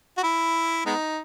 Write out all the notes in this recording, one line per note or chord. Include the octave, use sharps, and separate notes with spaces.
F#4
E4
G#3 B3 D#4